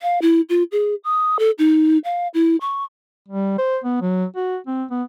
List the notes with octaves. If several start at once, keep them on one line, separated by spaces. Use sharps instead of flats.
F5
E4
F4
G#4
D#6
A4
D#4
F5
E4
C#6
G3
C5
B3
F#3
F#4
C4
B3